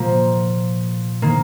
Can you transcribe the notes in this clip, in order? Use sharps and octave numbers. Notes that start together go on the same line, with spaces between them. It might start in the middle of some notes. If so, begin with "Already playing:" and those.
Already playing: A#2 F3 A#3
D#3 A#3